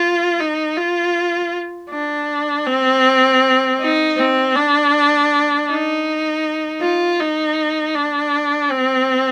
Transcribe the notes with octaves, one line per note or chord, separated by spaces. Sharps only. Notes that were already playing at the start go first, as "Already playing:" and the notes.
Already playing: F4
D#4
F4
D4
C4
D#4
C4
D4
D#4
F4
D#4
D4
C4